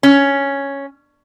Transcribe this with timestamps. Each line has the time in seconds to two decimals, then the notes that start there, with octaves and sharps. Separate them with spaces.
0.03 C#4